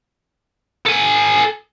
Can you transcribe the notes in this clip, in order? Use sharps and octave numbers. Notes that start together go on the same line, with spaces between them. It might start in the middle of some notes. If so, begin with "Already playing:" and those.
A4 G#5